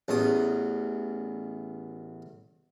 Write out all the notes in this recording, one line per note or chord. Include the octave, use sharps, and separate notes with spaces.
A1 E2 D#6